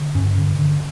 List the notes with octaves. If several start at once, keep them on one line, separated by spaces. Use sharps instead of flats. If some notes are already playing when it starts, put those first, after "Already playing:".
Already playing: D3
G2 C#4
D3
D3